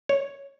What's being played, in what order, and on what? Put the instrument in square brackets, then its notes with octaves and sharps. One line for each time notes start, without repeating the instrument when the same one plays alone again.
[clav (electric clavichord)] C#5